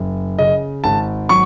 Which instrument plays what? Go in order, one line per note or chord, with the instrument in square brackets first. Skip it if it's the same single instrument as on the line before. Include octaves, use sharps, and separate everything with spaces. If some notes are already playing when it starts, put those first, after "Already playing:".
Already playing: [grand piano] F#1
C#3 D#5
G#1 A5
F#3 C#6